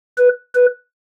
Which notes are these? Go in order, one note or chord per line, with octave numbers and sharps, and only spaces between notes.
B4
B4